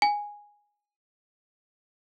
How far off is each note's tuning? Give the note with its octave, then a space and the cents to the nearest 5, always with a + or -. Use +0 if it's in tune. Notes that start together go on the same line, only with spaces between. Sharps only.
G#5 -5